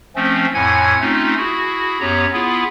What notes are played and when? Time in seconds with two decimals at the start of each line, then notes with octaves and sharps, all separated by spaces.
0.16 F3 A3 C4 C#4
0.54 F2 A2 F#5 G#5 G#6
1.00 A3 C4 C#4 D#4 F4
1.37 E4 F#4 G#4
2.01 F#2 B3 G4 C#5 A#5
2.33 B3 E4 F4 G#4